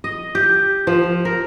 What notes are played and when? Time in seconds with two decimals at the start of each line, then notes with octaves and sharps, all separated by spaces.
0.04 D#5
0.35 G4
0.87 F3
1.25 A#4